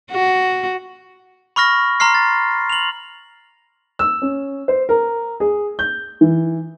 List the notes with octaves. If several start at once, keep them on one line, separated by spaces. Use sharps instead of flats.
F#4
B5 C#6 F6 A#6
A#5 C6 F6 C7
A6
F7 F#7
E6
C#4
C5
A#4
G#4
G6
E3